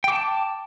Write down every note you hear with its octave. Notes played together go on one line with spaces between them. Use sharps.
G5 A5 D6